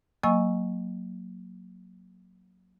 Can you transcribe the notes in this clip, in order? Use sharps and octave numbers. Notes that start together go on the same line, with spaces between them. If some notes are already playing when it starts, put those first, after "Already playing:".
F#3 A#3 D#5 G#5 C#6 E6